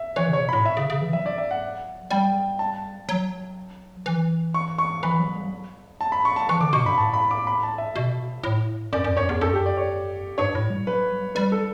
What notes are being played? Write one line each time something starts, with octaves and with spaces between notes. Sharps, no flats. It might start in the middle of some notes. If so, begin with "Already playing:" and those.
Already playing: E5
E3 C#5
C#3 C#5
B2
B5
A2
E5
C#3
C#3
E3
F#3 E5
D5
E5
F#5
G3 G5
A5
F#3
E3
C#6
C#6
E3 B5
F#3
G3
F#3
A5
B5
C#6
A5
E3 C#6
D3 D6
B2 C#6
G2 B5
A2 A5
B5
D6
B5
A5
E5
B2
A2
F#2 D5
F#2
F#2 C#5
E2
F#2 A4
G4
D5
C#5
G2 C#5
A2
G3
F#3 B4
G3
G3 B4
A4